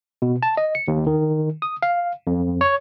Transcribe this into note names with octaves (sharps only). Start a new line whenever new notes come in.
B2
A5
D#5
C#7
D#2
D#3
D#6
F5
F2
C#5